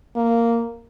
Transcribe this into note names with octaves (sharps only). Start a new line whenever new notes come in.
A#3